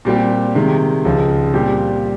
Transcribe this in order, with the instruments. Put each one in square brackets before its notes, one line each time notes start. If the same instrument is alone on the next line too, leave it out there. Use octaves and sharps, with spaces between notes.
[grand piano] A#2 G3 C4 G4
C3 D#3 G#3
C#2 C#3 F3
A#2 G3 C4 G4